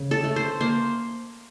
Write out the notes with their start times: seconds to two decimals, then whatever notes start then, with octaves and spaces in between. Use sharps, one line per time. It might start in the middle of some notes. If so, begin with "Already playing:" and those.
Already playing: C#3
0.11 A4
0.24 A3
0.36 C5
0.60 A#3 C5